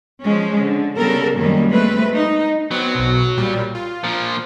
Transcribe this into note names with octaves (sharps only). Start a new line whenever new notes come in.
F3 G#3 C#4
D3
C#3 G3 B3 A4 A#4
F#2 D#3 G3 A#3 C#4
G#3 A3 C4 B4
D#4
F#3 B3 C4
B1 B2
A#2 G3
F4
A#2 F3